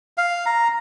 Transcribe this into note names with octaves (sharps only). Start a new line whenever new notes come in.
F5
A#5